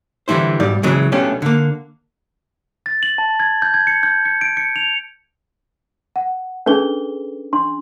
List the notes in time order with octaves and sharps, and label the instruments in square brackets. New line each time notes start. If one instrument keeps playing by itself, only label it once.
[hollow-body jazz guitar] D3 E3 G3 E4 C5
B1 G#2 G3 D5
C#3 E3 F#3 G#3
B1 A3 B3 C#4 D4 G4
D3 A#3
[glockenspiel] A6
F#7
A5
G#6
G6
G#6
C#7
G6
C#7
D7
C#7
F7
[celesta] F#5
[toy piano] C#4 D4 G#4 [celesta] A4 B4 G7
[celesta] D4 [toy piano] C6